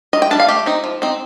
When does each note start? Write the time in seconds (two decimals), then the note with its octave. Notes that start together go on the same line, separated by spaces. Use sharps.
0.13 D#3 D#5
0.22 G5
0.31 G3 D4 A5
0.40 F5
0.49 A3 G4
0.66 C4 D#4
0.84 F3
1.02 C4 D#4